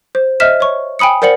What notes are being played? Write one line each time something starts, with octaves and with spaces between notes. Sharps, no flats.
C5
C5 D#5 E5 F6 B6 E7
C#5 C#6
G5 G#5 B5 D#6 C#7
A#4 C5 D5 F#5 C#7 F#7